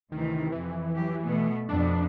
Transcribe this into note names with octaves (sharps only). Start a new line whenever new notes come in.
D2 C3 D#3 E3
F2 E3
F#3 G4
B2 A3 B3
F2 B2 D4